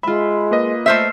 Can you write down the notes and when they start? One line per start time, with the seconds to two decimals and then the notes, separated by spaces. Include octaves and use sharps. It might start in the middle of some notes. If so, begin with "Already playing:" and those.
0.03 G#3 F4 E5 B5
0.51 A#3 B4 D#5
0.86 A3 C5 E5 E6 F6 C7